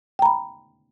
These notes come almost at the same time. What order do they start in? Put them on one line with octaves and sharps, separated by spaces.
G5 A#5 B5